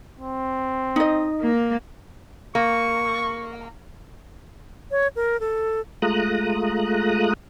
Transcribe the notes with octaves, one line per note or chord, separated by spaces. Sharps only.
C4
D#4 D#5
A#3
A#3 C#6
C#5
A#4
A4
G#3 A3 F4 A#5 D#6 F#6